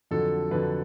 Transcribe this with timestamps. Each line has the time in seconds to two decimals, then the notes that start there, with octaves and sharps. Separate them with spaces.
0.11 F2 D3 F#3 A4
0.51 F2 D3 F#3 B4